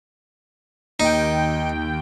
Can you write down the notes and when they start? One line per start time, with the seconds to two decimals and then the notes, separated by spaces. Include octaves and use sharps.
1.00 D#2 D#4 G5